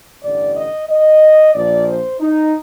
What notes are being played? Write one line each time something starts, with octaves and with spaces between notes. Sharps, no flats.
A1 G2 D3 D5
D#5
D#5
A#1 A#2 F3 D5
C5
D#4